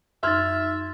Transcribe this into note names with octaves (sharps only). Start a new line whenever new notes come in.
F#2 D#4 E5 C6 F6 G#6 A6